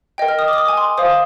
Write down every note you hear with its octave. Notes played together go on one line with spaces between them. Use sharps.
A#4 D#5 G5
F6
D#6
D6
D#6
D6
G#5
C6
C5 F5 D#6